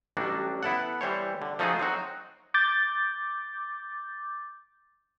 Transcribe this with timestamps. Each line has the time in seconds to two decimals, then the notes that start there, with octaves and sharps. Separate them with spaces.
0.17 A1 F#3 G3 D4 F#4
0.63 B3 E4 A4 F#5
1.01 E3 G3 C5 C#5
1.42 D3
1.59 F3 A3 D#4 F4 F#4 G#4
1.79 F#3 C4 D#4 F#4
2.54 D6 G6 A6